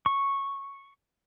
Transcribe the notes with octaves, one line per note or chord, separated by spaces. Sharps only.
C#6